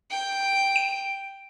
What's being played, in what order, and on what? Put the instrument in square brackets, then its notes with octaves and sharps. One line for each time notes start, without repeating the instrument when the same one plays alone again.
[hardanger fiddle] G5
[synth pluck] D7